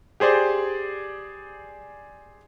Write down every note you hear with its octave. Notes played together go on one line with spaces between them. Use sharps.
G4 G#4 C5 D5